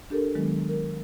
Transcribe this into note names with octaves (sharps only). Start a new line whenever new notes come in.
D4 G4 A4 A#4
D#3 F#3 G#3 B3
A#4